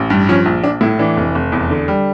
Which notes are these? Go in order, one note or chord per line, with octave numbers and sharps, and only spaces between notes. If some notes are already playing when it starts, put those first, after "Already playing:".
Already playing: A1
G2
F3 C#4
A#1
A#1 D4
A2 E4
E3 D4
F1
F1
E2
D3
G3